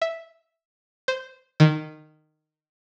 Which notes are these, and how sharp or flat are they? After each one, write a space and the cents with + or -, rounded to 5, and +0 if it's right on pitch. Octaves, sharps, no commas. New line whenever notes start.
E5 -5
C5 -10
D#3 -15